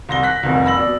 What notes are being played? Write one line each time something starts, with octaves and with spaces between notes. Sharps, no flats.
C2 C6 A#6 G7
F#6 A#6 B6
F1 C2
B5 E6 A#6 F#7
B2 D5